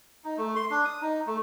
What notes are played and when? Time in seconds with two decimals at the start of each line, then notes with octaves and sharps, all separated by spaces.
0.24 D#4
0.37 A3
0.56 C6
0.71 D4
0.85 D#6
1.01 D#4
1.27 A3